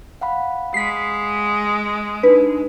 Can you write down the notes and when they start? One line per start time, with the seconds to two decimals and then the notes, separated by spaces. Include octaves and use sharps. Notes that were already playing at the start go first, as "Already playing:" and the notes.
0.21 F5 F#5 B5
0.74 G#3 B6 C7
2.23 D4 D#4 B4